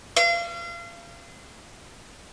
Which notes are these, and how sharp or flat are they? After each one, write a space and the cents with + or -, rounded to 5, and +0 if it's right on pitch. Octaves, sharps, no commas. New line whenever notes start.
F5 -35